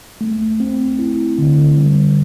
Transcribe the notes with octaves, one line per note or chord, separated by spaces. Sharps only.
A3
C4
E4
D3
G3